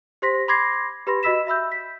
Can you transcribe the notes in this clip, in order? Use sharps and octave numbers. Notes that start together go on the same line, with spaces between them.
G4 C5 C6 A#6 B6
B5 C6 D6 G#6 A#6 C7
G4 B4 B5 C6 A#6
F#4 D#5 B5 E6 B6 E7
E5 B5 E6 G6
B6